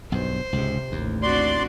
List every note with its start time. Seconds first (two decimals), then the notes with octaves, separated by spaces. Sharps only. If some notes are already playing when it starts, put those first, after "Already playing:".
0.12 B1 G2 C5
0.53 C#2 G#2 C3
0.92 A1 D#2
1.23 C4 D4 F#4 D5 C6